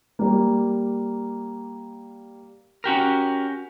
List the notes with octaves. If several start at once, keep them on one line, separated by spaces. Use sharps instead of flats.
G3 A#3
C#4 F#4 G4 A#4